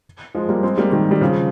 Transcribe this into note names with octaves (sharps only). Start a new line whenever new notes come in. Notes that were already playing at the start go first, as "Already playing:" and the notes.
F3 G#3
G3 A#3
G#3 C4
G3 A#3
D#3 G3
G3
C#3 F3